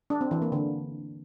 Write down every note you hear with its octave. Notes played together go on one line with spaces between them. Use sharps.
D4
C4
E3
A#3
D3